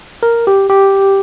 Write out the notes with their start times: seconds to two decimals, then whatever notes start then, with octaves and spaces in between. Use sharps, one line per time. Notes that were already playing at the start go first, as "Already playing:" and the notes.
0.23 A#4
0.47 G4
0.70 G4